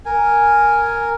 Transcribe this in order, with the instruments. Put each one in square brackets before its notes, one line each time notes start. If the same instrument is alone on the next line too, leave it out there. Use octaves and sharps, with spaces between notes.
[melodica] A#4 G#5